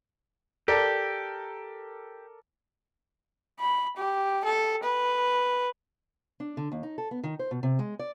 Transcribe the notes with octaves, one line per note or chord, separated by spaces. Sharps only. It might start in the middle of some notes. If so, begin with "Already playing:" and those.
G4 A4 A#4 D5
B5
G4
A4
B4
D4
D3
D#2
D#4
A4
B3
D#3
C5
B2
C3
G#3
D5